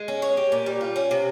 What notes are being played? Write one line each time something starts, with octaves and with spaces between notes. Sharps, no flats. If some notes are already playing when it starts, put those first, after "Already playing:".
Already playing: G#3
C#4
C#5
G4
A#2
G3
F4
C#4
C3